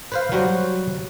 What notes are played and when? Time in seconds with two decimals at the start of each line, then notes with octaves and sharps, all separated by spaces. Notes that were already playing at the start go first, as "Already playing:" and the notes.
0.12 B4 C5 F5
0.32 F#3 G3 F#4 C5